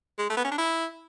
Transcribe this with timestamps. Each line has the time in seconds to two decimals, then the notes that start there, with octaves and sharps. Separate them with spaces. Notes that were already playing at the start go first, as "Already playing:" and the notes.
0.18 G#3
0.30 A3
0.37 B3
0.44 C#4
0.51 D4
0.58 E4